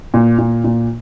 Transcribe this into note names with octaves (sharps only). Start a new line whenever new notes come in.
A#2
A#2
A#2